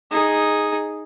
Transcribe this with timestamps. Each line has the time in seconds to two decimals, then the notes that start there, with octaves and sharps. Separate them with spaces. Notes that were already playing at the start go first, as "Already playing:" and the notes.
0.11 D#4 G#4